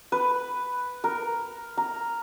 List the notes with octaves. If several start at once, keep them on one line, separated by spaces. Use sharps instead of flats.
B4
A#4
A#5